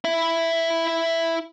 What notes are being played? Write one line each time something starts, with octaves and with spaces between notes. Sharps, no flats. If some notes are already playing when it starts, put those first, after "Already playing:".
E4 E5